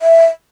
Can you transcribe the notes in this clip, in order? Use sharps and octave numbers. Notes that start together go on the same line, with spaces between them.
E5